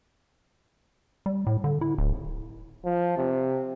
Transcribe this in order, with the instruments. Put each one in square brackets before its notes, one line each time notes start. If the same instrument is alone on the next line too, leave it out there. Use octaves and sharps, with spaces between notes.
[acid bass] G3
A2
D3
E4
D1
[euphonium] F3
C3